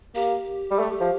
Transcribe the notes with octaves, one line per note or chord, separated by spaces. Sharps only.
A#3 G4
G3
A3
F3